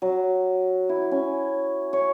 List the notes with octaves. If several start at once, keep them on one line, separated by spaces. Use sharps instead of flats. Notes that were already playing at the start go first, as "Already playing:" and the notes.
F#3
E4
C#4
C#5